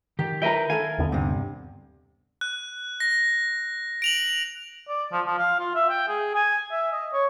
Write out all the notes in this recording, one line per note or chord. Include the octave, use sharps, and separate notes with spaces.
D#3 G4
A#4 B4 E5 G5 A#5
A4 A#4 F5 G#5
D#2 D3 B3
G2 C3
F#6
A#6
D7 F7 F#7
D5
F3
F3
F5
F4
E5
G5
G#4
G#5
E5
D#5
C#5